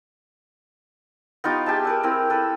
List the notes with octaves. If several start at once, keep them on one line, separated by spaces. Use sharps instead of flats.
B3 D#4 F4 G4
G4 G#4 E5 A5
A#4 B4 E5
C4 E4 A#4
A4 B4